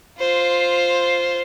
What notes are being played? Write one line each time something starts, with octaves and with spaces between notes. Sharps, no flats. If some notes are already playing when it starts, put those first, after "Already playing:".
F4 C5